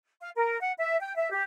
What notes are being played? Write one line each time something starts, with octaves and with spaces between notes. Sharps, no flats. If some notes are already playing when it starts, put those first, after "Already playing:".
F5
A#4
F#5
E5
G5
E5
G4